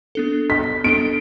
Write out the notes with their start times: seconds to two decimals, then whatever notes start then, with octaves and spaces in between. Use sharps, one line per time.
0.15 B3 D4 A4
0.50 B6
0.84 B3 D4 A4 D7